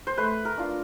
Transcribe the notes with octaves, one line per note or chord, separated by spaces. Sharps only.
C5
A3 B4
A#4
D4 F4